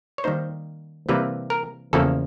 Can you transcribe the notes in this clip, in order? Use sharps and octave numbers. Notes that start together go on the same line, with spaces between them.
C#5
D#3 G3 A#3 D#4 C5
C3 E3 G3 A#3 B4
A#4
E2 C#3 F3 A#3 A4